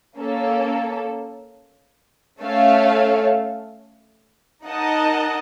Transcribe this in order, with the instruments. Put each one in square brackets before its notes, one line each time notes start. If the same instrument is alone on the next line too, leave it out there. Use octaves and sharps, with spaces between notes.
[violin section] A#3 C#4 A4
A3 C#4 A4 C#5 F5
D#4 A#4 D#5 F#5 A5